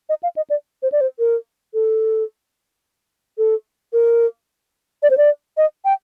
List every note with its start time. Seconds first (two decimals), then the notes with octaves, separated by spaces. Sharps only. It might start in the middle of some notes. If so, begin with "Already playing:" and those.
0.09 D#5
0.23 F5
0.36 D#5
0.50 D5
0.83 C5
0.92 D5
1.01 C5
1.19 A#4
1.74 A4
3.38 A4
3.93 A#4
5.03 D5
5.10 C5
5.17 D5
5.57 D#5
5.85 G5